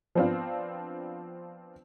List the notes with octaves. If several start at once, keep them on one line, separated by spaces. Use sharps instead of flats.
F3 B3 C4 D4 F4